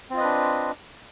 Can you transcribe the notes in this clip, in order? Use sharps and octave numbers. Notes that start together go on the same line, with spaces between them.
C4 D4 F4 B4 D#5